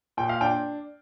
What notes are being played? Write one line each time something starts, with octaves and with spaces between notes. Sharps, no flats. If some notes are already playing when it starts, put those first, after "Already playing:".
A#2 G5
F5
D4 G5